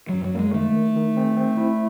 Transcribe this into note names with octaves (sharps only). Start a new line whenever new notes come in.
F#2 F#3
F#3
G#3 A#3
D#3 A3
D#3
D#3
C4
C4
E4